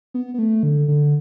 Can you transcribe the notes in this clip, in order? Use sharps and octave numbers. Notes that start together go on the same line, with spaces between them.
B3
B3
A3
D3
D3